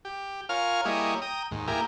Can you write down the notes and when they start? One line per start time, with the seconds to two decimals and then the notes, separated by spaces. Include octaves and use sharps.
0.05 G4
0.49 F4 A#4 C#5 F5 G#5 F6
0.85 G3 A#3 E4 G#4 C#5 D#5
1.22 G5 A#5 D#6
1.51 D#2 G#2
1.67 A#3 E4 G4 G#4 A#4